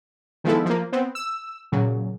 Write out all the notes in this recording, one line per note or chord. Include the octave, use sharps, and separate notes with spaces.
D#3 F3 G#3 B3 E4 A4
F3 A#3
B3 C4
E6
A#2 C#3 F#3